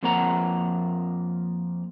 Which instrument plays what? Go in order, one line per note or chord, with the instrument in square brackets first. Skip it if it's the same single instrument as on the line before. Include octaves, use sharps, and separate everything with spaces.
[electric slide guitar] F2 F3 A#3 C#5 F#5 A#5